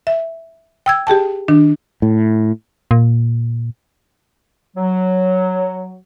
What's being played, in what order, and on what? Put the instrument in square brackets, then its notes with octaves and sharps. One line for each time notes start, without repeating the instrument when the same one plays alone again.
[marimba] E5
G5 E6 G#6
G4 G#4 G5 A5
D#3 D4
[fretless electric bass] A2
[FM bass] A#2
[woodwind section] F#3